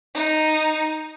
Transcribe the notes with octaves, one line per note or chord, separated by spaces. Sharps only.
D#4